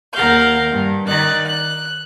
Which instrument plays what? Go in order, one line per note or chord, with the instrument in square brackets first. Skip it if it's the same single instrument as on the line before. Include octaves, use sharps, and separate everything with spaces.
[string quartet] D#2 A#4 F5 F#5 G6
G2
D#3 D#4 D5 F#6
F#6